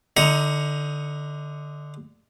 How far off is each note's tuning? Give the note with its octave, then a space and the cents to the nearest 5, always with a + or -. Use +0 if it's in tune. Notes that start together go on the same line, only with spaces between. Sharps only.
D3 +0 D#4 +30 A#5 +0